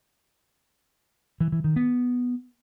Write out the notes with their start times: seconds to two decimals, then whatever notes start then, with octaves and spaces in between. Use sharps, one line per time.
1.41 E3
1.52 E3
1.64 D#3
1.76 B3